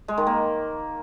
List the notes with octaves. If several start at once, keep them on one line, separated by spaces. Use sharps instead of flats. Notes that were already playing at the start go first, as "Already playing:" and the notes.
G#3
D#3
A#3